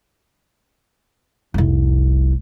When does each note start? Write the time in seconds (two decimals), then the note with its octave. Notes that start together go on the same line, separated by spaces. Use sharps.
1.54 F1 C2